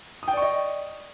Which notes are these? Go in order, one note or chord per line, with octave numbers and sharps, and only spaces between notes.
D5 D#5 G5 C#6 D#6